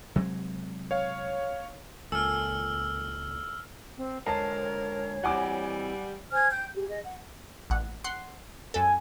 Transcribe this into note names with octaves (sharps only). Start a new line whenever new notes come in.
C3 F#3 G#3
C#5 F5
C#2 A#2 A4 G#5 E6 F6
C4
D3 G#3 A#4 C5 C#5 A5 A#5
E3 G3 C4 F#5 G#5 D6
C5 G#5 F6 G#6
G5 G6
G4 G#4
G#4 D#5
F#5
A1 F#5
F#5 C6
F#2 A4 G#5